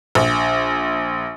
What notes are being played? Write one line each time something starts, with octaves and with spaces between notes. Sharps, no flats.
A#1